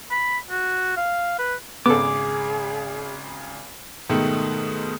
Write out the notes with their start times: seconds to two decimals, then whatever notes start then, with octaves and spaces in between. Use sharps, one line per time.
0.11 B5
0.50 F#4
0.97 F5
1.39 B4
1.86 G#1 C#3 B3 G#4 A4 D6
4.09 G#2 B2 D#3 A3